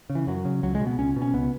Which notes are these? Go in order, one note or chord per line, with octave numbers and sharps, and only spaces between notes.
C#3
E3
F#2 F#3
C#3
C#2 F#3
G#3
B2
B3
C#2 C#4
B2
C#4
C#2 B3